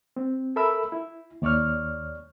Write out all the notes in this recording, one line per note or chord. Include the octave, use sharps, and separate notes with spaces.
C4
A4 A#4 E5 B5 E6
E4
D#2 C#5 D5 C#6 F6